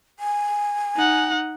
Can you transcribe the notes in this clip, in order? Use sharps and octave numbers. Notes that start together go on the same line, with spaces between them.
G#5
D#4 F#5